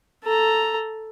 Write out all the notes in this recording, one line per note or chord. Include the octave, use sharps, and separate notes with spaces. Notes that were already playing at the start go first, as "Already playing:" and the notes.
A4 A#5